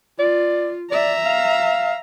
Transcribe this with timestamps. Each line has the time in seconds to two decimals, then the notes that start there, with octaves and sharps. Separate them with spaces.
0.19 F4 D5
0.91 D5 E5 A#5
1.25 F5